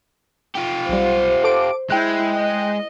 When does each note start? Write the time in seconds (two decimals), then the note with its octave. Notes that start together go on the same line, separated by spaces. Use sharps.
0.56 F4 G4
0.89 B1 G3 C5
1.44 A4 D6 D7
1.90 G#3 E4 G5 F#6
2.37 D#5